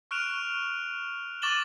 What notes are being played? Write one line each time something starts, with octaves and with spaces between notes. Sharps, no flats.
C#6 F6 F#6 D7 E7 F7
C#6 D6 A6 E7 F#7 G7